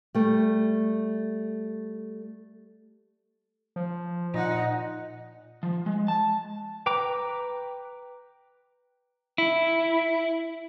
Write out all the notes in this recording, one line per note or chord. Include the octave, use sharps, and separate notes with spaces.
G3 A3
F3
A#2 D#4 F#5
F3
G#3
A5
B4 G5 A#5 D6
E4